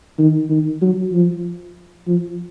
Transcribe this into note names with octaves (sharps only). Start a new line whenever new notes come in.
D#3
D#3
F#3
F3
F3